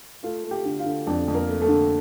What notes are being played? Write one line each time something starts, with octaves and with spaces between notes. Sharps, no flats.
A3 F4 F5
A3
G4 G5
D3
F4 F5
D3
F2 D4 D5
F2
A#3 A#4
A3
A3 A4
D3